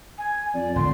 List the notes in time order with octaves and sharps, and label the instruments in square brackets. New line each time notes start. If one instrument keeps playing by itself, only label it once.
[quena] G#5
[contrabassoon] F2 [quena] D5
[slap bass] G#1 D2 [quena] C6